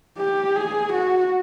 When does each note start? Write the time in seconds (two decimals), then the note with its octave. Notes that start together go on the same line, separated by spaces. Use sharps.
0.18 G4
0.56 G#4
0.93 F#4